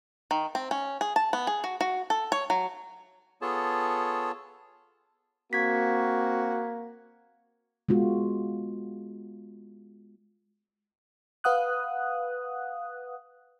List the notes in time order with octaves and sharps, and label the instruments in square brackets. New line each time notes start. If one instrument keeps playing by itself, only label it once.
[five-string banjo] D#3
C4
C#4
G#4
A5
B3
G#4
F#4
F#4
A4
C#5
F#3
[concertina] B3 F4 G#4 A4 C#5 A5
[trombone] A#3 [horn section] C4 F#4 [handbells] G#6 B6
[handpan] G#3 B3 F4 F#4
[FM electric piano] B4 F5 F#5 D#6 F#6